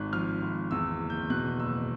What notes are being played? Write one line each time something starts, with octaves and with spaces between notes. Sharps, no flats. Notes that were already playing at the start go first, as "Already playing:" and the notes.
Already playing: G#1 G#2 F#6
F3 F6
G#1
E2 E6
F#1
G6
B2 F#6
F#1 E6